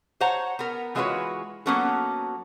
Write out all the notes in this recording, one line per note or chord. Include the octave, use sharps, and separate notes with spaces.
C5 C#5 F#5 A#5
B3 A#4
E3 G#3 F4 F#4 B4 C#5
F#3 A#3 B3 C#4 F#4 A4